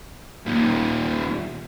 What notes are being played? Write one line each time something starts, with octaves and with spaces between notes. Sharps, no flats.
D#2 A#2